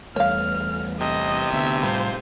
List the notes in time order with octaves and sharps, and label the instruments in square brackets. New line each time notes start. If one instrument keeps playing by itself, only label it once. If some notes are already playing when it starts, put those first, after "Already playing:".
[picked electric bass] E2 G3 A3 [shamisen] C#5 F5 [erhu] F6
[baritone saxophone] C3 [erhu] D#5
[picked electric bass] D2 D3 B3 [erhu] E5
[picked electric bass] A2 G3 [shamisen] F3 [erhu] C5